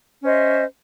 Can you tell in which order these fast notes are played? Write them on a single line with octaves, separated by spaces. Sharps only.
C#4 C5 D#5 E5